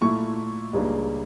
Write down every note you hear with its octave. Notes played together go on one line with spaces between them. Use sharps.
A#2 A3 E4 C#6
C#2 C#3 G3 A#3 D4